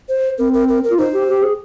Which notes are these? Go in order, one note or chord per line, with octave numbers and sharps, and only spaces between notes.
C5
C4 A#4
A#4
A#4
A#4
F4
D#4 C5
G4
G4
G#4